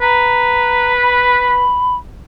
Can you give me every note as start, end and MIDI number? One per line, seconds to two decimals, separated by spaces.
0.01 1.71 71
0.01 0.93 82
1.02 1.96 83